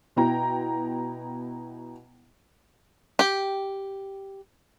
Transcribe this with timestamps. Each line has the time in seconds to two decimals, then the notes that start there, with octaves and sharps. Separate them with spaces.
0.16 B2 B3 E4 G5 A#5
3.19 G4 G5